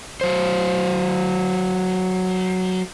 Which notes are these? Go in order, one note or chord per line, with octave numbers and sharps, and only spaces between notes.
F#3 C5